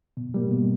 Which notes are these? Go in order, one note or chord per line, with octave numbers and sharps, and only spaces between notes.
B2
G3 A#3
B2